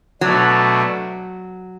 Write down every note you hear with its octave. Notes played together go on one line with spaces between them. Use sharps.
B2 F#3 A3 D4